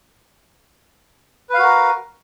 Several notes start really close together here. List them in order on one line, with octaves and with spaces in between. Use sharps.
B4 F5 F#4 A#4